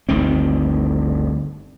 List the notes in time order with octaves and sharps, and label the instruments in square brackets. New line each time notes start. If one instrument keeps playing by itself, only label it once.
[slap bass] G1 D2 D#3 C4